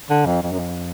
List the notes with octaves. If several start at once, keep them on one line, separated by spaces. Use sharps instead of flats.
D3
F2
F2
F#2
F2